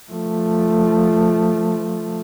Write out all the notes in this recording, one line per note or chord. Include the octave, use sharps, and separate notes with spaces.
F3 A3